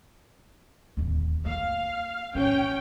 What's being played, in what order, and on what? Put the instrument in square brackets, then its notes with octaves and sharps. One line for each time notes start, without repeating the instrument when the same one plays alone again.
[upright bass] D1 D#2
[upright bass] A#3 [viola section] F5
[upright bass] A1 D4 [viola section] C#4 G5